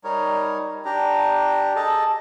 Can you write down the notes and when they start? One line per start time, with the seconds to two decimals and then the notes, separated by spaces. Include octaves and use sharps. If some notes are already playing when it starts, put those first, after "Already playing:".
0.04 G3 D#4 A#4 C#5
0.85 D4 G4 A#5
1.76 G#4 A4 D#5 A5